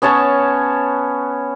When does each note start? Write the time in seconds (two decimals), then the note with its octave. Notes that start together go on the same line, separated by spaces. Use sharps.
0.02 B3 C#4 C#5 A5